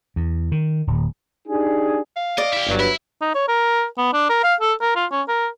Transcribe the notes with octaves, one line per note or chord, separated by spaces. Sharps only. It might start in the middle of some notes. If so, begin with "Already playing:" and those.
E2
D#3
D1
D4 D#4 G4 G#4
F5
D5 D#5
E4 G4
G1 G2 F#3
E4 B4
D#4
C#5
A#4
B3
D4
A#4
F5
A4
A#4
F4
C#4
A#4